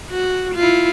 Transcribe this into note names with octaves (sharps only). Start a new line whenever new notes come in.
F#4
E4 F4